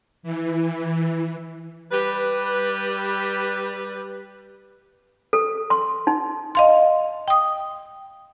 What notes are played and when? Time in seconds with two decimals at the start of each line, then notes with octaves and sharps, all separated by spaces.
0.23 E3
1.92 G3 G4 B4
5.33 A4
5.70 C6
6.07 D#4
6.55 D#5 F5 C6
7.28 G5 D#6